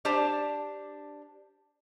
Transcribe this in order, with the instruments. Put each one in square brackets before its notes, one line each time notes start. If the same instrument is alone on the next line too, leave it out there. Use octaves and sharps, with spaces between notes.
[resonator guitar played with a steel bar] D4 G4 C5 D5 A5